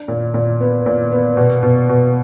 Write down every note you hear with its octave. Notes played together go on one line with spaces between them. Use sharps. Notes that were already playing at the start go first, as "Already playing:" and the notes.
Already playing: D4
A#2
A#2
B3
A#2
B3
B2
B2
B2